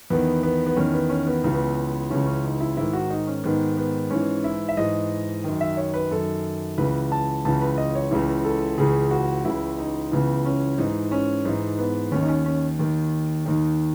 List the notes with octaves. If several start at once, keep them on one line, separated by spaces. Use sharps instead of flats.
E2 D#3 B3
B3
B3
E2 D#3 C#4
B3
C#4
B3
C#2 C#3 E3
B3
C#2 C#3 E3 C#4
C#4
D#4
E4
G#2 D#3 E4
F#4
D#4
C#4
G#2 D#3 B3
B3
G#2 E3 C#4
E4
E5
G#2 E3 D#5
F#2 D#3
E5
C#5
B4
F#2 D#3 A4
C#2 C#3 E3 B4
A5
C#2 C#3 E3 A5
B4
D#5
C#5
C#2 C#3 E3
A4
C#2 C#3 E3 G#4
F#4
C#2 C#3 E3 E4
D#4
C#2 C#3 E3 B3
C#4
G#2 E3 D#4
C#4
G#2 E3 D#4
B3
D#2 D#3 C#4
D#4
C#4
C#4
D#2 D#3
D#2 D#3 D#4